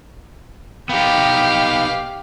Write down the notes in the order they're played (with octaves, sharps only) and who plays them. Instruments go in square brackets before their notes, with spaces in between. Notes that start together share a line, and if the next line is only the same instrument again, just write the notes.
[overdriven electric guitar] B3 D#4 [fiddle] G4 F5